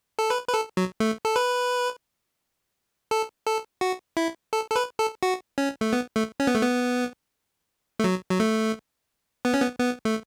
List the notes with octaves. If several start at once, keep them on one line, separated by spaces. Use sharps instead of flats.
A4
B4
B4
A4
F#3
A3
A4
B4
A4
A4
F#4
E4
A4
A4
B4
A4
F#4
C#4
A3
B3
A3
C#4
B3
A3
B3
A3
F#3
F#3
A3
B3
C#4
B3
B3
A3